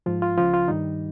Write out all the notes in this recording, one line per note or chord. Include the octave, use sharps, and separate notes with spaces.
G#2 F3 F4
F4
C#2 C#3 F3 F4
F4
G2 D#3 G3 D#4